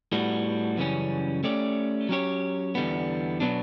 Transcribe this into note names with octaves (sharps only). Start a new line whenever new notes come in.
A2 G3 B3 F#4
F#2 C#3 E3 G3 C#4
A3 C#4 G4 D5
F#3 C#4 G4 C#5
E2 D3 G3 B3
B2 F#3 B3 D4